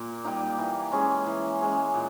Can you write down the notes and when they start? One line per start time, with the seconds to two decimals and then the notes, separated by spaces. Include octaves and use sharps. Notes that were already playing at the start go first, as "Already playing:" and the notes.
Already playing: A#2 A#3
0.25 G3 A#3 D#4
0.58 E3
0.92 G#3 C#4 G#4
1.26 E3
1.61 G#3 C#4 G#4
1.94 A#2